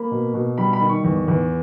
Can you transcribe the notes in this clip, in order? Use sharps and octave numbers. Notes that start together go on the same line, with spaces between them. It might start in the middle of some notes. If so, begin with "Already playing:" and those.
Already playing: A#3 B5
B2
B2
G3 B5
B5
D#3
C#6
E2
E2